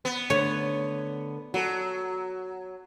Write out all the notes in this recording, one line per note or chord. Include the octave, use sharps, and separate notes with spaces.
B3
D3 A3 C#5
F#3 F#4 A4